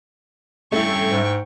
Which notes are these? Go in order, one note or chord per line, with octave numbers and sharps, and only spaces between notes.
G2 A3 C#4 E4 G5 C#6
G#2